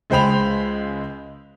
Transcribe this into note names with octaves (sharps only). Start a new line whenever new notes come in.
C#2 G#3 C5 G5 B5 F7